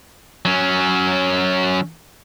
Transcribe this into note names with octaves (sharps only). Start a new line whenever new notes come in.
F#3 C#4